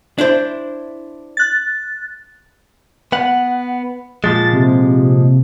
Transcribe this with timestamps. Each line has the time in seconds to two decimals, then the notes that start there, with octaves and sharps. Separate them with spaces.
0.18 D4 E4 C5
1.37 F#6 A6
3.12 B3 F#5
4.24 A#2 F3 G#3 A6
4.53 C3